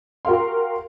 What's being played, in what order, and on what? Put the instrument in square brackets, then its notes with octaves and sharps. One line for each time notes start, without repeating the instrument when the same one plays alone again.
[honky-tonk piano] F#4 G4 A#4 F5 C6